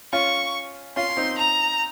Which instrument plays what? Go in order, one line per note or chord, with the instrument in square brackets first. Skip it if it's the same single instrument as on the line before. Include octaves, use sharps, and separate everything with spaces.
[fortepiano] C#4 F4 [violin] C#6
[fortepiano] C#4 F4 [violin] C6
[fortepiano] C4 D#4
[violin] A#5